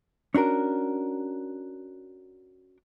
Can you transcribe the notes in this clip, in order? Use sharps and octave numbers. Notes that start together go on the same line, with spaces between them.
C#4 D4 F#4 A#4